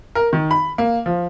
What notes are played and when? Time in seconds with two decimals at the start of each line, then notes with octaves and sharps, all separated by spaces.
0.15 A#4
0.33 D#3
0.51 B5
0.78 A#3
1.06 F3